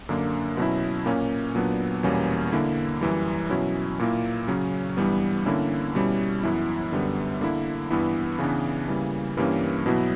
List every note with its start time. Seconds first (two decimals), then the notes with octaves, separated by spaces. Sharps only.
0.09 F#2 D3 A#3 D4
0.57 B2 F#3 C#4 E4
1.06 A#2 A#3 C#4
1.55 A#2 F#3 B3 D4
2.03 E2 B2 G3 A#3 C#4
2.52 D3 A#3 E4
3.01 F#2 E3 G3
3.50 B2 F#3 C#4 E4
3.99 A#2 A#3 E4
4.48 C#3 F#3 C#4
4.97 G2 E3 G3 B3
5.46 D3 A#3 C#4 E4
5.95 B2 G3 C#4 E4
6.43 F#2 E3 B3 E4
6.92 F#2 D3 G3 B3
7.41 D3 A#3 E4
7.90 G2 E3 B3 E4
8.39 C#3 E3 B3 D4
8.88 C#3 E3 G3 A#3
9.37 G2 E3 G3 A#3 C#4
9.86 B2 F#3 B3 E4